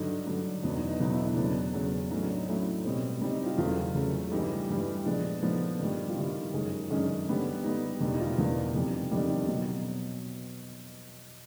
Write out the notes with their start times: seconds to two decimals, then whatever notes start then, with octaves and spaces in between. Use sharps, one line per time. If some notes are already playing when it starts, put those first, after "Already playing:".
Already playing: G2 D3 F#3 D#4
0.26 G2 D3 F#3
0.63 E2 B2 F#3 B3 D4
0.76 D#4
0.88 D#4
1.00 E2 B2 F#3 B3 D#4
1.12 E4
1.25 D4
1.36 E2 C#3 F#3 B3 D4
1.74 E2 C#3 F#3 B3
2.10 A2 F#3 A3 C#4 D#4
2.23 D4
2.35 D#4
2.47 A2 F#3 A3 C#4 E4
2.85 B2 G3 C4
3.21 B2 G3 C4 D#4
3.33 D#4
3.46 F4
3.58 E2 C#3 F#3 A3 F4
3.95 E2 C#3 F#3 A3
4.32 G2 E3 G3 D#4
4.69 G2 E3 G3
5.05 A#2 F3 G#3 B3 D4
5.42 A#2 F3 G#3 B3 D#4
5.79 G2 D#3 G3
6.09 F4
6.17 G2 D#3 G3 E4
6.53 F#2 D#3 G#3 C#4
6.90 F#2 D#3 G#3 C#4 D4
7.27 D3 G3 B3
7.64 D3 G3 B3 D#4
8.00 E2 B2 G3 A#3 D4
8.13 D#4
8.20 F4
8.26 E4
8.38 E2 B2 G3 A#3 D4
8.74 F2 C3 D#3 G3
9.11 F2 C3 D#3 G3 D4
9.31 D4
9.48 B2 F#3 B3 D#4